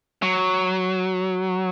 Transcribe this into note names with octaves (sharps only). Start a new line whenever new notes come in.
F#3